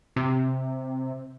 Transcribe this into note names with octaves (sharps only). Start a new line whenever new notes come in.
C3